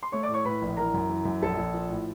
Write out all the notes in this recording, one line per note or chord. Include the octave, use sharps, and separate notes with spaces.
C6
A3 C#5 C#6
D5 D6
A2
C#5 C#6
A2 B4 B5
A#1
E3 A#4 A#5
F#2
E3
F#2
A#1 A4 A5
A#1
F3
A2